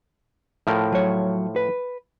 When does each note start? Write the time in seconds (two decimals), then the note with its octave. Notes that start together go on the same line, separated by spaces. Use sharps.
0.67 A2 F3 A#4
0.92 F#3 C#5
1.56 B4